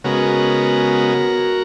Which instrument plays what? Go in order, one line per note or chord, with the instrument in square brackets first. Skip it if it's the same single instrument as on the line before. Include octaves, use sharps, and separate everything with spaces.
[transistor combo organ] C#3 G#3 B3 F#4 A#4